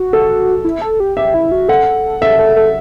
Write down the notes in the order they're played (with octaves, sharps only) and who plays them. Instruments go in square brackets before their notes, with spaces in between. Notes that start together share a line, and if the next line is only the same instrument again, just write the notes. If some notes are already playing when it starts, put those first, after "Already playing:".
Already playing: [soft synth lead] F#4
[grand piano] A4
[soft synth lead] E4
A4
G4
[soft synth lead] G4 [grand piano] E5
[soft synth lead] E4
F#4
[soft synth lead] A4 [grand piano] F#5
[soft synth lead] A4 [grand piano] E5
[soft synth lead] A4
A4